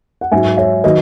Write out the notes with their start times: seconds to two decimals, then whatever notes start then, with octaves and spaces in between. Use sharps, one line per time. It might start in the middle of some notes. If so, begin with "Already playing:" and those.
0.21 F#5
0.32 G#2 F#3 E5 G#5
0.57 C#5 E5
0.84 D#3 F#3 B4 D#5